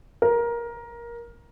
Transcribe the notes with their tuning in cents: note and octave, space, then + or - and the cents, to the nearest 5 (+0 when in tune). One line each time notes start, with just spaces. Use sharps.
A#4 +15